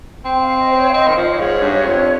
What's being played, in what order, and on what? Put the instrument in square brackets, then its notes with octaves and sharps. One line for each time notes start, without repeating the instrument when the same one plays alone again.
[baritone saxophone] C4 [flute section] G5
[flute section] F5
D#5
C5
C#5
F5
[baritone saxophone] C4 [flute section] D#5
[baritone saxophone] D#3
F3
[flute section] D#5
C#5
[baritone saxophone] G#2
G2
F2